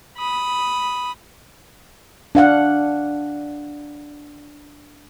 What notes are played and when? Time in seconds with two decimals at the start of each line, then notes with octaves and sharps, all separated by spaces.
0.17 B5 D#6
2.35 D4 F5 F#5